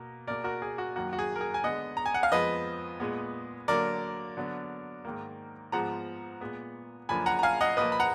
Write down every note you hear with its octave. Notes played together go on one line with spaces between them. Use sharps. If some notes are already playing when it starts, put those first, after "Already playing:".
Already playing: B2 A#3
B2 A#3 A#4 D5
F#4 A#4
G#4
F#4
F#2 D#3 A#3 F#4
F#4
G#4
A#4
G#4
G#5
D3 G#3 B3 D#5 F#5
A#5
G#5
F#5
F5
F2 F3 G#3 B3 B4 D#5
A#2 G#3 B3
D3 F#3 A#3 A#4 D5
D3 F#3 B3
G#2 D#3 A#3
G#2 F3 G#3 B3 F#5 A#5
A#2 G#3 B3
F#2 D3 F3 A#3 G#5 B5
F#5 A#5
A#5
F5 G#5
D#5 F#5
A#2 F3 A#3 B4 D#5
B5
F#5 A#5